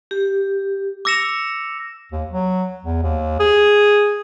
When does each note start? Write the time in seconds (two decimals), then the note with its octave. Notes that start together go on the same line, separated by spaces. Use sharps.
0.11 G4
1.05 D6 E6 A#6 C#7 E7 F7
2.12 D#2
2.30 F#3
2.84 E2
3.03 D#2
3.40 G#4